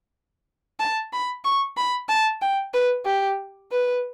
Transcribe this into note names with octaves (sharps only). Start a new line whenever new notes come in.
A5
B5
C#6
B5
A5
G5
B4
G4
B4